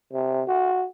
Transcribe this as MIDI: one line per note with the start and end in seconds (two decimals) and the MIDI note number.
0.13 0.43 48
0.48 0.86 66